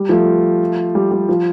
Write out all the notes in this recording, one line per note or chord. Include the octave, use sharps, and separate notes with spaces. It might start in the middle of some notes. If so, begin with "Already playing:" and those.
Already playing: G3
F3 A3
G3
G3
F3